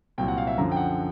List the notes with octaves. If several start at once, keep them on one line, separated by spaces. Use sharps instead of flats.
C2 A#2 F#3 G5
F#5
F5
E5
F#2 D3 F3 A#5
G5
F#5